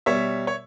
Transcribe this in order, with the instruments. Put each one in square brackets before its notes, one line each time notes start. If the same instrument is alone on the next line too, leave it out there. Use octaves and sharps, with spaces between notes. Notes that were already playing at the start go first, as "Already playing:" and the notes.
[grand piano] B2 G3 C#5 E5
C#5